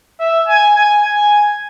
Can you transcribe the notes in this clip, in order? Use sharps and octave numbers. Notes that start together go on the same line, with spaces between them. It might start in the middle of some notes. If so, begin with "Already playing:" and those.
E5
G#5
G#5
G#5